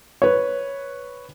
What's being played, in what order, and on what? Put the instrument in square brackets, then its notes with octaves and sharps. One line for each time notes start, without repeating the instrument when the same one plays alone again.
[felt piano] B4 C#5